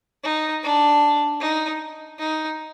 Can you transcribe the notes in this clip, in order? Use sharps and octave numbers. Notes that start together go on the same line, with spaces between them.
D#4
D4
D#4
D#4